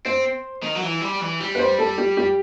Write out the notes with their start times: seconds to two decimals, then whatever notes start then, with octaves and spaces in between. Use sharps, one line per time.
0.05 C4 C5
0.63 D#3
0.75 F#3
0.82 E3
1.01 G3
1.21 E3
1.40 G3
1.55 B4
1.59 C5
1.79 A4
1.98 G4
2.17 G4